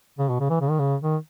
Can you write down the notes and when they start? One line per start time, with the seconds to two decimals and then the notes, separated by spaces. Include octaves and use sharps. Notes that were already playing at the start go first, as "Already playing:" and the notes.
0.19 C#3
0.29 B2
0.40 C#3
0.50 E3
0.61 C#3
0.70 D#3
0.79 C#3
1.02 D#3